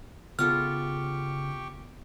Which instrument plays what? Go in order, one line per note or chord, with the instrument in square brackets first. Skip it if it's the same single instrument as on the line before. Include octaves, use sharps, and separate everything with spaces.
[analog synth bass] C#3 [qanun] B3 F4 A4 [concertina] G4 G5 C#6 [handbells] F6